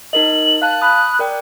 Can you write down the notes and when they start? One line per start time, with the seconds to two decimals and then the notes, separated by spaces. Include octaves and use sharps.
0.13 D#4 A#4 D#5 F#7
0.62 F5 A5 F#6
0.82 B5 D#6
1.19 A#4 D5 G5